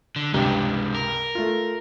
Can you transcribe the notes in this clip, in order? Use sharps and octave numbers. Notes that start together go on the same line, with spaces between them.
D3
C#2 G2 C3 G#3 D4
A#4
A3 F4